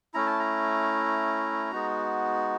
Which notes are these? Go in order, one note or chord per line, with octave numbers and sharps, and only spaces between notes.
A3 C#4 E4 A#5
A5
A#5
G#3 B3 D#4 F#4